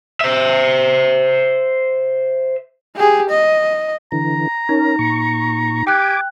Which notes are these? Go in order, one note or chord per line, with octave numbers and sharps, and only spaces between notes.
C5 E5
G4 G#4
D#5
D3 E3 A#5
C#4 D#4 A#4
A#2 C#6
G4 G5 G#5 D6 F#6